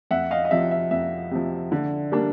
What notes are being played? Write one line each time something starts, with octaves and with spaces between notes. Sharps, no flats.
F2 E5 F#5
D#5 F5
D#5
C3 F3 E5
E5
F2 E5
C3 F3
D3
G3 A#3 D4